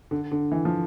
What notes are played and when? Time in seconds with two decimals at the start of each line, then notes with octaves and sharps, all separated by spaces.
0.11 D3
0.32 D3
0.52 E3
0.65 F3